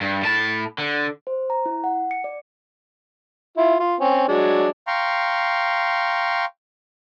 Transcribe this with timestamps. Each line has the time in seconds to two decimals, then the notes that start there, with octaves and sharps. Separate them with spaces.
0.01 G2
0.23 A2 A5
0.78 D3
1.27 C5
1.50 A#5
1.66 E4
1.84 F#5
2.11 C#7
2.24 D5
3.57 E4 F4
3.80 F4
4.01 C4 C#4
4.28 F#3 G#3 D4
4.87 F5 G5 A#5 C6 C#6